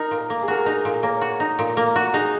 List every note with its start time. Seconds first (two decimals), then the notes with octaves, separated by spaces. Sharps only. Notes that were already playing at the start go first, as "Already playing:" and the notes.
Already playing: D#4 A#4
0.11 A#2
0.18 A#4
0.30 A#3
0.42 G#4
0.48 F#4 A#4
0.57 G#4
0.66 D#4 A#4
0.85 A#2
1.03 A#3 C#5
1.21 F#4
1.40 D#4
1.59 A#2
1.77 A#3
1.96 F#4
2.13 D#4 G#4